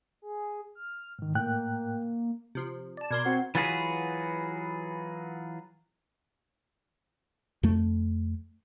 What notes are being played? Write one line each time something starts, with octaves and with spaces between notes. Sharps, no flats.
G#4
F6
G#2 D#3
A2 A#3 G5 F#6
C3 F3
D5 A5
B2 A#4 D5 C6 G#6
C4 F#4
E3 F#3 F4 F#4 G#4 B4
F2 A3